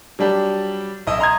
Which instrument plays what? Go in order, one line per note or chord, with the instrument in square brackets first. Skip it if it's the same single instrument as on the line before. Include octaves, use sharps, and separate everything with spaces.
[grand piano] F#3 G3 D4 G4
B1 D#5 E5 E6
D#5 A#5 C6 D#6 G#6